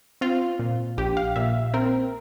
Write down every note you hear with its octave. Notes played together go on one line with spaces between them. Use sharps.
C4 F4
A#2
A#1 G4
F5
A#2 E5
C4 A#4